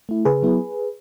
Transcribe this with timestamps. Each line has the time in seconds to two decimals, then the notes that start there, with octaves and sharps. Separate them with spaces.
0.09 A3 E4
0.25 C#3 G#4 B4
0.42 F#3 B3 E4